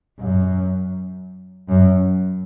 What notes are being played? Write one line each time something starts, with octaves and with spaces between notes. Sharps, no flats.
F#2
F#2